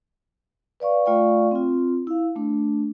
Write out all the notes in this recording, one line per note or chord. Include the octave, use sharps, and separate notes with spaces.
B4 D5 F5 C#6
A3 F4 D5 F5 G5 C#6
C4 F4
E4 F5
A3 D4